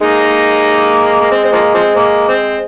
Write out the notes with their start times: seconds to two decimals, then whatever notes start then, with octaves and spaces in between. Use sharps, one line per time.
0.01 G#3 A#3 D#4
1.21 A#3
1.31 C4
1.45 C4
1.52 F3 A#3
1.74 F3 C4
1.95 A#3
2.28 C4